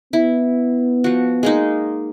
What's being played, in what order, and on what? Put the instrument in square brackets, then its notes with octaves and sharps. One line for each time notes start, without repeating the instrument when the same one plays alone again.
[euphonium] B3 [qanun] E4
[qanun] F3 F#4
G#3 A#3 D#4